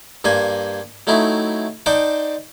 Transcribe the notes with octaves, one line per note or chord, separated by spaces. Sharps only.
G2 A#3 C5 G#5
F#3 A3 C4 D#4 E4
D#4 C5 D5 F#5 G5 A5